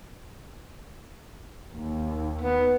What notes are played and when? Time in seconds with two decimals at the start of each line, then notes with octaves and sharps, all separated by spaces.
1.70 D#2
2.41 B3